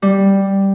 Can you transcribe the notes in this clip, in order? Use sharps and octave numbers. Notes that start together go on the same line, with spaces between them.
G3